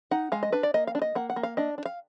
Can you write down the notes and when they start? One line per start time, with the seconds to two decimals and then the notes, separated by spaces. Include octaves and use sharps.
0.11 D#4 F#5
0.32 G#3 F5
0.43 D#5
0.52 D4 B4
0.63 D5
0.74 A#3 D#5
0.87 F5
0.95 D4
1.02 D#5
1.15 A#3 F#5
1.30 F#5
1.36 A#3
1.43 F5
1.57 D4 D#5
1.78 D4
1.86 F5